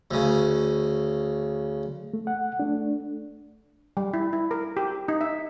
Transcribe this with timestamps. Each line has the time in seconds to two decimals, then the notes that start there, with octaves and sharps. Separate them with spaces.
0.11 D2 C#3
2.13 A3
2.27 F#5
2.60 A3 D4
3.97 G3
4.14 E4
4.33 E4
4.51 A#4
4.77 G4
5.08 D#4
5.21 E5